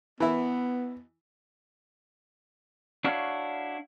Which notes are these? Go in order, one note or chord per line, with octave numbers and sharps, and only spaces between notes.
E3 B3 E4
D4 E4 F#4 C#5 F5